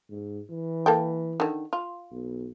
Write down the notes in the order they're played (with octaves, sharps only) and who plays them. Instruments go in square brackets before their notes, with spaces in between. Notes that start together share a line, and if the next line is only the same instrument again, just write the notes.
[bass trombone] G#2
E3
[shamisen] A#3 A4 G5
D3 D#3
F4
[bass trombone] B1